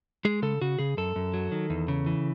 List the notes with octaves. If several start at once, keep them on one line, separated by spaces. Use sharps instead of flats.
G#3 G#4
C#3 A4
C#3 F#4
C#3 G#4
F#2 A4
F#2
F#3
D#3
E2
C#3
E3